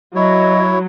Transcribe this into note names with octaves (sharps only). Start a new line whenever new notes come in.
F#3 E4 C#5 D#5